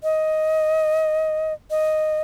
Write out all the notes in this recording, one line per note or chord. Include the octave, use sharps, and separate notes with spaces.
D#5
D#5